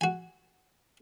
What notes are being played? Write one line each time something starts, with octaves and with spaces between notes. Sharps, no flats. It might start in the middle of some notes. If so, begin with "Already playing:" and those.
F#4 G#5